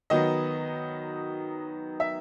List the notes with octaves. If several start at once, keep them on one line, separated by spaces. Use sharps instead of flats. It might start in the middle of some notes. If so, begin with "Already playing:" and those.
D#3 F#3 B3 D#5
E5